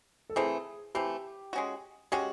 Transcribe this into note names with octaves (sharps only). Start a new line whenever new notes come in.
A4
E3 A3 C4 G#4
E3 A3 C4 G4
G#3 C#4 F#4
G#3 C#4 F#4 G4